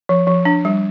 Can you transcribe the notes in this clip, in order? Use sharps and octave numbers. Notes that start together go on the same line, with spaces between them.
F3
F3
D4
G3